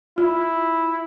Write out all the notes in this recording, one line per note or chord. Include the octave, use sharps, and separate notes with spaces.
E4 F4